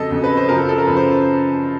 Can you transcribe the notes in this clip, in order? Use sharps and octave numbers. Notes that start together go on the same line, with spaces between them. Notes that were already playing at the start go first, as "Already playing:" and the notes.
Already playing: F2 C#3 F#3 A4 D#5
F2 C#3 F#3
B4
C5
F#2 C#3 F3 A#4
A4
A4
A#4
F#2 C#3 F3 B4
C5